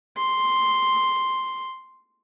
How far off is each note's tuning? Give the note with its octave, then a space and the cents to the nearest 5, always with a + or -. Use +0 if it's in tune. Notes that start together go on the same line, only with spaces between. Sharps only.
C6 +0